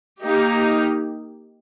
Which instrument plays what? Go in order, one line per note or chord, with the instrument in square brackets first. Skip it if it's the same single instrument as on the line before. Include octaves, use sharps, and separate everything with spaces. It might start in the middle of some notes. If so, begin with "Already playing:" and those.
[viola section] A#3 D#4 G4